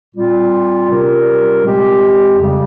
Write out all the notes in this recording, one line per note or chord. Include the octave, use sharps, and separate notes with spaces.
A#2 G3 C4 F4
C3 G3 C#4 F4 A#4
A#2 G#3 C4 G4
F2 C#3 G3